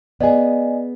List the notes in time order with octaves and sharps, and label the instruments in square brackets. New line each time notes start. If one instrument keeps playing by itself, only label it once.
[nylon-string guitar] B3 G#4 [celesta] D5 D#5 G#5